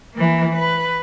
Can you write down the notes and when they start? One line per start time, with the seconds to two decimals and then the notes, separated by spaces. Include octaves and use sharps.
0.14 E3 A#3
0.55 B4